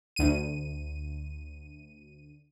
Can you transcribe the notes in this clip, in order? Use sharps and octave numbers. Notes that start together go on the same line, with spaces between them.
D2 D#7